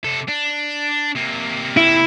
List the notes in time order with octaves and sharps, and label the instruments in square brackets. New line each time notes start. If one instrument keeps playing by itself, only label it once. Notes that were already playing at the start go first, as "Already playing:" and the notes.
[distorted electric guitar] C3 A4
D4
C3 A#3
[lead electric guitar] E4